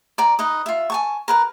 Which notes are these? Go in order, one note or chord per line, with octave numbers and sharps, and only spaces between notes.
D5 A#5
D#4 B4 D#5
F4 E5
G#5 A5 C#6
A#4 B4 A#5